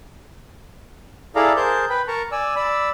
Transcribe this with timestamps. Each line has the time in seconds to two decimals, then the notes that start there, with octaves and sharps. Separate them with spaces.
1.36 E4 G#4 A4 D5 F5 A#5
1.56 G#4 A#4 C5 A5 G6
1.90 B4 G5 B5
2.08 A#4 A5 A#5 C#6
2.32 D5 G#5 E6
2.56 D5 B5 E6